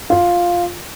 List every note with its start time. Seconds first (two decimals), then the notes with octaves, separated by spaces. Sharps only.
0.10 F4